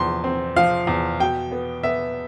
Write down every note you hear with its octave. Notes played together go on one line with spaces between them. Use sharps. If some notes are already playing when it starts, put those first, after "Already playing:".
Already playing: E2 F3 C6
C4
F3 F5
E2
B2 G5
B3
B3 E5